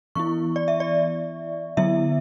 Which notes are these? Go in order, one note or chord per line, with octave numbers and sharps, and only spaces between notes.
E3 B3 E4 C#6
D5
E5
D5
D3 F#3 B3 E4 E5